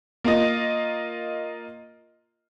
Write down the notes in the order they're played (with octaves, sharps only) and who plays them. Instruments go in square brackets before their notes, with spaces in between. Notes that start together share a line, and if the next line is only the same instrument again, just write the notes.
[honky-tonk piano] A#3 F4 D#5